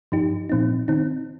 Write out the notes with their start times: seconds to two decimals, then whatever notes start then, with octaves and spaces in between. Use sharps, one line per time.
0.12 G2 F3 D#4 G4
0.49 A#2 F3 C4 D#4
0.88 D#3 C4 D#4